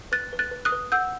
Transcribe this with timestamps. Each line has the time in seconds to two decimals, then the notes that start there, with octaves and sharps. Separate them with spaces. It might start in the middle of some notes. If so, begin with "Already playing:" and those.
0.12 B4 F#6 A6
0.33 B4
0.39 F#6 A6
0.51 B4
0.65 D#6 F#6
0.72 B4
0.92 F#5 E6 G6